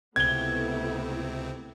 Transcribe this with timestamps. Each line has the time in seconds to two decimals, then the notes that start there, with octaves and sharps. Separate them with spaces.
0.16 C#2 C3 A3 B3 C4 E4 G#6 G7